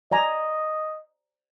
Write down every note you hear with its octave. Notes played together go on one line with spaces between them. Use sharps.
D5 D#5 G#5 A#5